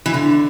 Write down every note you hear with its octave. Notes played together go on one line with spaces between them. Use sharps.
E3
D3